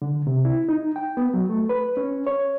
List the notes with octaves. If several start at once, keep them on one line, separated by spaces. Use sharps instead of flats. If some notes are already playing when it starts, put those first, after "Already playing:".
D3
C3
E4
D#4
G5
B3
F#3
A3
B4
C#4
C#5